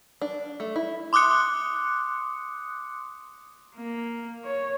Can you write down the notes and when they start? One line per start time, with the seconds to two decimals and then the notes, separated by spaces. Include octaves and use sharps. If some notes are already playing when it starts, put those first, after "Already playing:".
0.22 D4
0.60 A3
0.76 E4
1.13 C6 D6 D#6 F#6 C#7
3.76 A#3
4.45 C#5